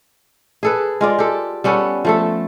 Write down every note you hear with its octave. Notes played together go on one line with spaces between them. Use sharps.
G#4 A4 B4
G#3 F4 D5
G4 A4
G3 B3 C#4 A4
F3 A3 A4